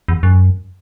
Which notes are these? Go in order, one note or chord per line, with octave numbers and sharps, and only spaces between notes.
E2
F#2